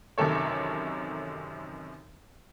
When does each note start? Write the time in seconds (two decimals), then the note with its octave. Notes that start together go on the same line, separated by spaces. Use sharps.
0.18 A1 F#2 C3 D#3 A4 C#5